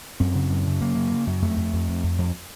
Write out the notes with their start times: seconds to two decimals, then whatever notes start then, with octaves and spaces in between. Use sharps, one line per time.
0.20 F#2 C4
0.35 C#3
0.50 F#2
0.66 C#3
0.81 F#2 A#3
0.96 C#3
1.12 C#3
1.27 F#2
1.42 F2 A3
1.57 F2
1.73 F2
1.88 F2
2.04 F2
2.18 F2